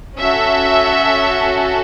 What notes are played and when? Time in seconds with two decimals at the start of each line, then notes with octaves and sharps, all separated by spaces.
0.17 C#4 F#4 A4 E5